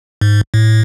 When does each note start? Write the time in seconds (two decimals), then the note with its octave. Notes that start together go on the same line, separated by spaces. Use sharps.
0.21 G#2
0.54 A2